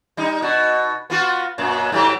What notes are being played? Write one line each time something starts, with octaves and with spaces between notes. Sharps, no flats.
G3 D#4
B2 F#4
B3 F4 F#4
F#2 A#2
G#2 F#3 G4